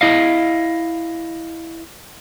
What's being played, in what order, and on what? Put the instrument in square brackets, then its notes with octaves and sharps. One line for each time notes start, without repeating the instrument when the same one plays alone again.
[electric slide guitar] E4 D#5 F5